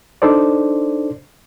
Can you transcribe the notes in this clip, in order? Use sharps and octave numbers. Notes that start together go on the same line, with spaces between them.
D4 D#4 A4 C5 D5